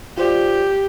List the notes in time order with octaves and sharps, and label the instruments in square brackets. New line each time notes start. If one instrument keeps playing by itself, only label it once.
[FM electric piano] F4 C5 D5 [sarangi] G4